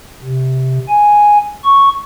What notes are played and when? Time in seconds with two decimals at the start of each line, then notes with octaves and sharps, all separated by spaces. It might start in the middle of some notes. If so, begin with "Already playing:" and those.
0.24 C3
0.88 G#5
1.64 C#6